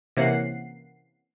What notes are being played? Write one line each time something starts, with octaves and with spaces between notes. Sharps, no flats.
C3 E3 A#3 C#4 F#5 C7